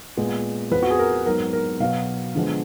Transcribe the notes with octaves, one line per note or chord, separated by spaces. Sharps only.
A#2 G#3 B3
F2 F3 B3 B4
F#4
G#4
A#4
G#2 F#3 B3 A#4
A#4
B2 F#3 B3 F5
D3 F3 G#3 B3